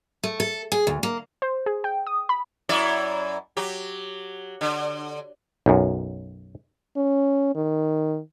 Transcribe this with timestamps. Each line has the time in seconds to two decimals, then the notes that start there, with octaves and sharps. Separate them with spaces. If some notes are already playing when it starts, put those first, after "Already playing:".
0.23 A3
0.40 A4
0.72 G#4
0.87 D2
1.03 A#3
1.42 C5
1.66 G#4
1.84 G5
2.07 D#6
2.29 B5
2.69 F#2 E4 D5
3.57 F#3 G4
4.61 D3
5.66 B1 F#2
6.96 C#4
7.55 D#3